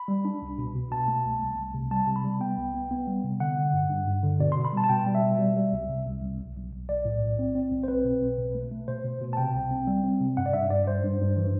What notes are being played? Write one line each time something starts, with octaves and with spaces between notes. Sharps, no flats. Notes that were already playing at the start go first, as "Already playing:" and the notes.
Already playing: B5
G3
D4
C2
B2
B2
B2 A5
A3
C2
C2
C2
C3
G3 A5
C3
B5
G3
B3 G5
C2
B3
B3
G3
C3
D3 F#5
D3
G2
G2
G2
D3
B2 D5
C6
B2
B5
G3 A5
A5
B2 G5
G3
E5
B2
G3
G3
C2
C3
C2
C2
B1
B1
B1
B1 D5
A2
B1
C4
C4
B1
C5
C4 B4
B2
B1
B2
A3
A3
B2 C5
B2
B2
A5
C3 G5
C2
C4
G3
C4
C3
G2 F#5
D5
G2 E5
G2 D5
G2 C5
G2
G2
E3